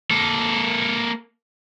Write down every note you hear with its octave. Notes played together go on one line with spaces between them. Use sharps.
A#3 A4